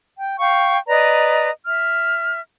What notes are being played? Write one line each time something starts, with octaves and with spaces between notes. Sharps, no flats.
G5
F5 G5 C#6
B4 D5 D#5 A#5
E5 F6